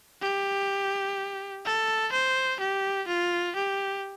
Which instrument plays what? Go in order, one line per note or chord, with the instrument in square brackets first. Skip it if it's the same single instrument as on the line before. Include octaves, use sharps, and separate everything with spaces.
[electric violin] G4
A4
C5
G4
F4
G4